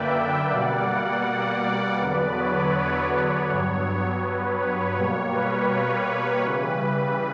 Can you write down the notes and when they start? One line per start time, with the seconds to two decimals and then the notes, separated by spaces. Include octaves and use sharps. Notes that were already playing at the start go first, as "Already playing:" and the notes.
Already playing: F#2 D3 A#3 B4 D5 E5 G5
0.51 B2 G3 A#3 D5 F#5
0.88 D5 F#5
1.62 D5 F#5
1.99 E2 D3 F#3 B3 B4 D5
2.37 C#5
3.10 C#5
3.47 G2 F#3 B3
4.21 B4
4.58 C#5
4.96 B2 G3 A#3
5.33 B4
5.70 C#5
6.07 C#5
6.44 C#3 E3 G3 B4
6.80 B4